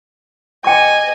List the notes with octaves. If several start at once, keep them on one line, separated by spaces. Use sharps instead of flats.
D#5 G5 G#5 D6